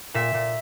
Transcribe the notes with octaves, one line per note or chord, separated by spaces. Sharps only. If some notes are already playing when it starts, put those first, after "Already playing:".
A#2 E5
A#2